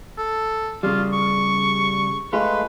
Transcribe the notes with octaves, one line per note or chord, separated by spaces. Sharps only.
A4
C#3 G3 F4
C#6
G#3 A3 F4 B4